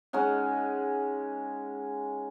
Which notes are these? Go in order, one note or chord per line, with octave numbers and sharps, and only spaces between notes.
G#3 C#4 D#4 F#5